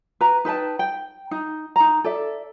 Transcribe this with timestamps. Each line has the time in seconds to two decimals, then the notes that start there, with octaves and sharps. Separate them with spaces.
0.21 B4 A#5
0.45 D#4 B4 G5 A5
0.79 G5
1.31 D#4
1.76 D#4 A#5
2.04 A4 D5 E5